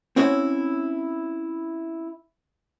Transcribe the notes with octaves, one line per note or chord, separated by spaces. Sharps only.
C4 C#4 E4 F#4 C#5